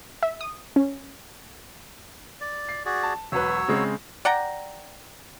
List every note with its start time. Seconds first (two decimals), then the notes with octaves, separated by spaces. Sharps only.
0.23 E5
0.41 D#6
0.76 C#4
2.41 D5
2.69 C7
2.85 F#4 G#4 D5
3.03 A5
3.32 E1 F#3 B4 C#5 E6
3.68 C#3 G#3 C4
4.25 D5 F#5 G5 A#5